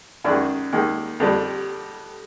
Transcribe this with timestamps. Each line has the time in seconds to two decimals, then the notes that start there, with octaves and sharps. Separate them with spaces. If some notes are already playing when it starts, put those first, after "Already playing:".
0.24 F#2 D#3 G#3 D4
0.73 D#2 D#3 G#3
1.20 F2 D3 G3